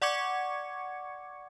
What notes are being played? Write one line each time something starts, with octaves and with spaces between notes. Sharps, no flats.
D5 F#5 C#6 D6 G#6 C#7